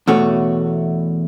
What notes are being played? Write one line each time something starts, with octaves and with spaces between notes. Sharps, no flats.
E2 B2 A3 F#4 C#5